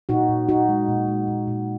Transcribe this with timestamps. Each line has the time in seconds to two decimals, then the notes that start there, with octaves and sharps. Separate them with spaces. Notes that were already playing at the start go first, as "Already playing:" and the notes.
0.09 A#2 D#4 F#4
0.29 A#2
0.48 A#2 D#4 F#4
0.69 G#3
0.88 A#2
1.08 G#3
1.28 A#2
1.48 A#2